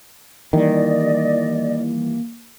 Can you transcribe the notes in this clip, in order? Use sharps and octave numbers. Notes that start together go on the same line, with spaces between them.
D#3 E3 G3 A#3 D5 D#5